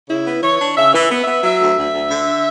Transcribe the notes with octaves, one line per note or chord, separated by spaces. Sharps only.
C#3 E4
B3
E3 C#5
D4
C#3 E5
E3
B3
E5
B3
F#3 E5
D2
D2
D2
D3